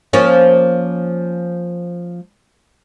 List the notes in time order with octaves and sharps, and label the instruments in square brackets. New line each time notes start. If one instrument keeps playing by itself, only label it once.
[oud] F3 A#3 C#4